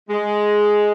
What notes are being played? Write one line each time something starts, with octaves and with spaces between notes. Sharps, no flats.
G#3